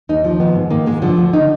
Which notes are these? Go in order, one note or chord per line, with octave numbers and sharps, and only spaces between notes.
D#2 D#4
F3
D#3 B3
G#2
D#3 A#3
G#2 G#3
D3 F3
D2
D#4